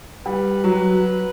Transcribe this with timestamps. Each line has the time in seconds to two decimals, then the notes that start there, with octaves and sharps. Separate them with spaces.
0.25 G3 B4
0.64 F#3